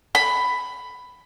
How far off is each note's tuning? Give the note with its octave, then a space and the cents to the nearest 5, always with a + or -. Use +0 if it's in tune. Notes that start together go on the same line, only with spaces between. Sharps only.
B5 +10